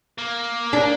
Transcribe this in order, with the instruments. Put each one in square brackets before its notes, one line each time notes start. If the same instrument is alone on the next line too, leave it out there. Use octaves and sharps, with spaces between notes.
[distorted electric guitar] A#3
[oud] D4